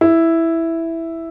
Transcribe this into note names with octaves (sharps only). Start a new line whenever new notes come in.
E4